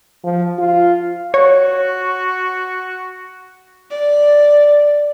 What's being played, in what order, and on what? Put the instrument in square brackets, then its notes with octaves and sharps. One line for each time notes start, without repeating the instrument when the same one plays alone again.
[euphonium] F3
F4
[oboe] F#4 [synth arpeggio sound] C#5
[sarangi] D5